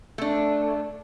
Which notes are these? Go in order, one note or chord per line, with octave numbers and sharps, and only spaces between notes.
A3 D4